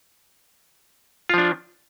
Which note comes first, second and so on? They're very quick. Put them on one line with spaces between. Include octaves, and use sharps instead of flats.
F4 F3 D4